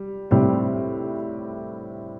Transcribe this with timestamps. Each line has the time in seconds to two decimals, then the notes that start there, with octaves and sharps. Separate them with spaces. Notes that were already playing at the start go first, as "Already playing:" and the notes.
Already playing: G3
0.31 A2 G3 C4